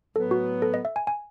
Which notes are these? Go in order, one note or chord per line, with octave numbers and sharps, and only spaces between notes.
A2 F#3 B3 A4
F#4
A4
D#5
E5
G#5
G#5